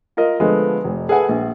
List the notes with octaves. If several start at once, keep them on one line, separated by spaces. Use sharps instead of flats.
F4 A#4 D#5
D3 F3 G#3 A3 B3
F1
G#4 A4 B4 E5 F#5 G#5
A#1